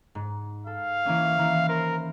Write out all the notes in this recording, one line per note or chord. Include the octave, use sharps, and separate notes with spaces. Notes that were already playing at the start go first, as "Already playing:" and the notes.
G#2
A4 F5
E3 A#3 C#4
D#3 A#3 E4
A#4 C5